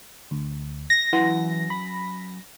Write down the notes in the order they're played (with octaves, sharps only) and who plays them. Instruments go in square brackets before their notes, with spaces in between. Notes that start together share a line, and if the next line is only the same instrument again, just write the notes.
[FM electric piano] D2
[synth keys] A#6
[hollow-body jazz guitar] F#2 F#5 C6 [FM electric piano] E3
[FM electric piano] B5